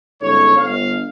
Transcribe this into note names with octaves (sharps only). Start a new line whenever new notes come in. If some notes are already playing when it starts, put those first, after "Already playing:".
G1 G#2 C#4 A4 C#5
G1 F5